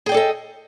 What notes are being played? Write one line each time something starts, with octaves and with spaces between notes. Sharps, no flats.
G#4 A4 D5 D#5 G5